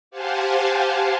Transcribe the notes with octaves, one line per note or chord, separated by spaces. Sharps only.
G4 C5 F5 F#5 G#5 A5